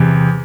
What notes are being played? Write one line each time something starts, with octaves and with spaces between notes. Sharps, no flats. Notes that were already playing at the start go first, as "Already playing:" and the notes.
Already playing: E2 C3